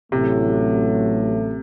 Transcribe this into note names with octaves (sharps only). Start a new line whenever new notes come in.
A1 A2 C3 F#3 A3